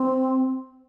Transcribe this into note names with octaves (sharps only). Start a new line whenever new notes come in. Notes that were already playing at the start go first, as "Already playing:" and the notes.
Already playing: C4